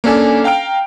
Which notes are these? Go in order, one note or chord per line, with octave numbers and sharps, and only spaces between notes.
A#3 C#4 D4 A4 G#5
F5 G5 A#5 F6 D7